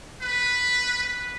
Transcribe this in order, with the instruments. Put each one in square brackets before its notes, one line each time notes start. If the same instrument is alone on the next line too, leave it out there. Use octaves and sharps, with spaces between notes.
[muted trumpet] B4
B4